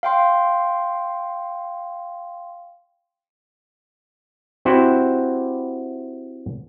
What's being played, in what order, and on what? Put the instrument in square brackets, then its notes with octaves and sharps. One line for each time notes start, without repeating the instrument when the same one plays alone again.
[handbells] F5 G5 C6
[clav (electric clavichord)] C4 E4 F#4 G4 C5 F#5